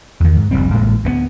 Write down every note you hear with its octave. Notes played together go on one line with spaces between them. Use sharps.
E2 D#3
G#2
F1 A#1 G3 C4
A1 A2 G#3 A#3
D2 G#3 B3